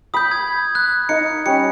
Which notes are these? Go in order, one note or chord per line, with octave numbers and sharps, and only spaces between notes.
B5 D6 D#6 G6
G#6
F#6
D#4 F5 C#7
G3 C#4 C#7